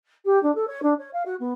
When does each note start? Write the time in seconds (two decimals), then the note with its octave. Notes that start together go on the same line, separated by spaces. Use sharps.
0.25 G4
0.42 D4
0.55 A4
0.67 C#5
0.82 D4
0.98 C#5
1.13 F5
1.25 F#4
1.39 B3